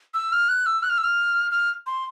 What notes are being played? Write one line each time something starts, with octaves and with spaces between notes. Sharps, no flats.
E6
F6
F#6
E6
F#6
F6
E6
F6
F6
C6